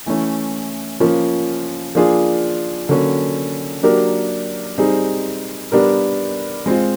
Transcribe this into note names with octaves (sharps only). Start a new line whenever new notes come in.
E3 A3 C#4
F3 A#3 C#4 F4
F3 A#3 D4 F4 G#4
D3 F#3 A#3 C#4
F#3 A#3 D4 G4 A#4
G3 C4 D#4 G#4
G3 B3 D4 G4 A#4
G#3 C4 F4